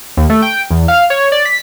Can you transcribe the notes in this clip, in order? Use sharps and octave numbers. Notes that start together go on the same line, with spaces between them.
D#2
A3
G5
E2
F5
C#5
D5
B6